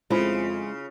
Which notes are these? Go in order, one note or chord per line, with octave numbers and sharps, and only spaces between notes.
F2 C#3 G#3 E4 F4 C5 B5